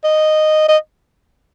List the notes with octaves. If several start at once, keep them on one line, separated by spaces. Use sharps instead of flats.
D#5
D#5